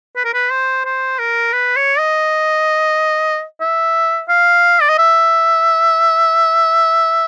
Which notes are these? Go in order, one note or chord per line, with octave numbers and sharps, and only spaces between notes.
B4
A#4
B4
C5
C5
A#4
B4
C#5
D#5
E5
F5
D5
D#5
E5